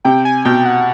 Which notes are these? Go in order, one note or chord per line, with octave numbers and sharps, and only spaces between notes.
C3 G5
G#5
B2 G5
F#5